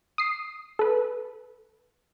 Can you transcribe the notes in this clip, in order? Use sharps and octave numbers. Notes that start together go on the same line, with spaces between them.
D#6 C7
A4 B4